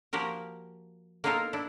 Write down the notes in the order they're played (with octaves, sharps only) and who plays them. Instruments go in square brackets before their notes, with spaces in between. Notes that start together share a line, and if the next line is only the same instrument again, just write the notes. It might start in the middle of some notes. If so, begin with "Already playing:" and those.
[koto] F3 A#3 F#4 G4 A#4
A#3 B3 D#4 F4 A4 A#4
D4 E4